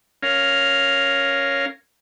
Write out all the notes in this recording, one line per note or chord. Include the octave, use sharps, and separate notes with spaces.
C#4 A#4 F5